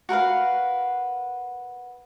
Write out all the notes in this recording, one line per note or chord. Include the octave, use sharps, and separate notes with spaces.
F#4 A#4 B4 F5